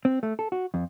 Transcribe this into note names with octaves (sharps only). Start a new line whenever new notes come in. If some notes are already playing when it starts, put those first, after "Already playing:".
C4
A3
A4
F#4
F2